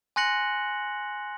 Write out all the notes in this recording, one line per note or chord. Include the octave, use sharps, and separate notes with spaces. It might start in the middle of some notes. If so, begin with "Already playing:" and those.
G#5 C6 F#6 A#6 C#7 F#7